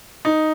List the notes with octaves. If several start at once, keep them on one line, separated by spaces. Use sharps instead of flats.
D#4